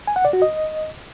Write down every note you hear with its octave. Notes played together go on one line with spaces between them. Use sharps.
G#5
F#5
D5
F#4
D#5